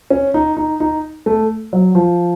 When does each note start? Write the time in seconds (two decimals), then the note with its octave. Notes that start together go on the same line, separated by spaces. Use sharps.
0.10 C#4
0.34 D#4
0.57 D#4
0.80 D#4
1.26 A3
1.73 F#3
1.95 F3